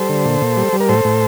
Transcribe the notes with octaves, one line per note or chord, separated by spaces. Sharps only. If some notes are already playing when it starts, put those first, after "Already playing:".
Already playing: G3 A4 C5
D3
A#2
A#2
G3
G3
A#4
A2 A4 C5
A2